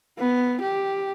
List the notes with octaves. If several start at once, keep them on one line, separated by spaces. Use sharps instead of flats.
B3
G4